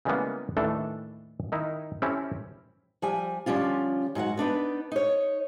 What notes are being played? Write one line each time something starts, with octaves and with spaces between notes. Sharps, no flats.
C#3 E3 G3 G#3 A#3 B3
D#2 A2 E3 A3 D4 A4
D#3 D#4 E4
C4 C#4 E4 G4 A4
F3 G3 G#5
D3 F3 G3 C#4 F4
G#2 F#3 F#4 F#5
B3 D4 D#4 B4
D#4 C#5